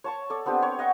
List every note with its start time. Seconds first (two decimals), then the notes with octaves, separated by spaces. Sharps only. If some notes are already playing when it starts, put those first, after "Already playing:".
0.04 C#5 A5 C#6
0.30 A4 D5
0.46 B3 C4 D4 G4
0.62 C#5
0.79 D#5 F#5 G5 C#6